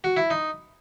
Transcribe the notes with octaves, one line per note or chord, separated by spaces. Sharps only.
F#4
E4
D#4